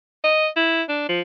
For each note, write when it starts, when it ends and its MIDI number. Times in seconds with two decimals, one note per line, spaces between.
0.24 0.47 75
0.56 0.82 64
0.89 1.04 62
1.09 1.21 53